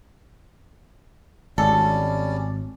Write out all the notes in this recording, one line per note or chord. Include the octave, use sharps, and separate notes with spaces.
G#1 G3 C#4 A4 D5